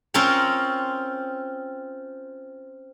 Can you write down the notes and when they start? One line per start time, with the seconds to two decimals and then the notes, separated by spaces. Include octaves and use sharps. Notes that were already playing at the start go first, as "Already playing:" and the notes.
0.14 C4 C#4 F4 A#4 C#5